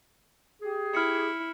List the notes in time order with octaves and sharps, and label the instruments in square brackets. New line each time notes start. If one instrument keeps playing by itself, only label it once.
[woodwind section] G4 G#4
[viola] E4 [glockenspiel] F6 C#7